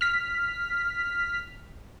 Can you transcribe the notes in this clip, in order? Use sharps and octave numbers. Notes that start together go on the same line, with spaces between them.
F6 B6